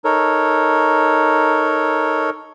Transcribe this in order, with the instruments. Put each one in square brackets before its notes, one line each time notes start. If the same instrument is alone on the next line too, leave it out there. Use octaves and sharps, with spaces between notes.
[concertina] D#4 A4 A#4 C#5